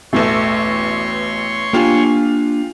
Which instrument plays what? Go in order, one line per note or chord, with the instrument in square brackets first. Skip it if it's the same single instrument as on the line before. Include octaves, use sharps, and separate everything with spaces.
[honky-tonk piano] A1 E2 B2 [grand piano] A3 [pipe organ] C#5 C6 C#6
[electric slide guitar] A#3 D4 G#5 [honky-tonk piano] F4 G4